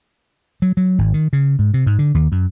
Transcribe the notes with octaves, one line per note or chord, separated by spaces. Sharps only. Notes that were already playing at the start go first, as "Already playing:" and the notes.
F#3
F#3
G#1
D#3
C#3
G#2
C3
G#2
D3
D#2
F#2